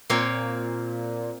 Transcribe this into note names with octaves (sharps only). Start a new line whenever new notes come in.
A#2 A#3 C4 C#5